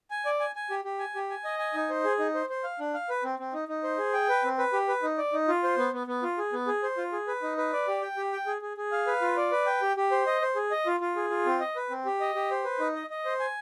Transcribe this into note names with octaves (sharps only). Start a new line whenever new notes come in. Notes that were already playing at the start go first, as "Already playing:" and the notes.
G#5
D5
G#5
G#5
G4
G4
G#5
G4
G#5
D#5
G#5
D#4
C5
G#4
D#4
C5
C5
F5
D4
F5
B4
C4
C4
D#4
D#4
C5
G#4
G5
B4
C4
B4
G4
B4
D#4
D5
D#4
F4
C5
B3
B3
B3
F4
G#4
B3
G#4
C5
F4
G#4
B4
D#4
B4
D5
G4
G5
G4
G5
G#4
G#4
G#4
F5
B4
F4
D5
B4
G5
G4
G4
C5
D#5
C5
G#4
D#5
F4
F4
G#4
F4
C4
D#5
B4
C4
G4
D#5
G4
C5
B4
D#4
D#5
D#5
C5
G#5